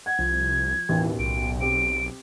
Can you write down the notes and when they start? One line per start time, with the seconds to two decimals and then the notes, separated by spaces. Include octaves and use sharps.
0.06 F#5 G#6
0.19 C2 F3
0.89 A1 D#2 B2 E3
1.19 B1 D7
1.60 C4 G4 D7